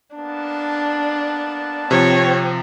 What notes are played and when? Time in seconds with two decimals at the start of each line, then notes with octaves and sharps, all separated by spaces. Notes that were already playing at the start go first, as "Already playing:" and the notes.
0.15 A#3 B3 D4 A5
1.91 C3 F3 C4 C#5